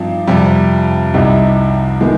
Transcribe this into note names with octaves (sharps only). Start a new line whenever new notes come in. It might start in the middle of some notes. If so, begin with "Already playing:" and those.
Already playing: G2 F3 C4 D#4
F2 C3 G3
C2 C3 G3 C4 D#4
D#3 G#3 B3